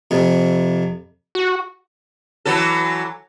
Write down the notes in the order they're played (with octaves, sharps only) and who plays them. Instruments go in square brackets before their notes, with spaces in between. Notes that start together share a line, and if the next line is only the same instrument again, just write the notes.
[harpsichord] F2 C3
[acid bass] F#4
[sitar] E3 F#3 A4